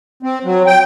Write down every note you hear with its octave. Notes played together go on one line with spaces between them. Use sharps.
C4
F#3
G5